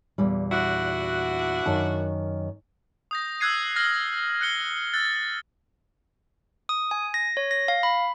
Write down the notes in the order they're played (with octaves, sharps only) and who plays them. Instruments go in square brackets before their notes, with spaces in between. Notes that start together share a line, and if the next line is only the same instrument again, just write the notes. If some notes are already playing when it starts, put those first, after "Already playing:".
[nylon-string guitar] E2 A#2 G3
[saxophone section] D4 E4 F#4
[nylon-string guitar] F#2 D#3 A5
[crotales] D#6 G6 A#6
E6 F#6 G#6 C7 D#7
F6 A#6 F#7
F#6 C#7 G7
E6 F#6 A6 G7
[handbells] D#6
G#5
A#6
C#5
A#6
F5
B5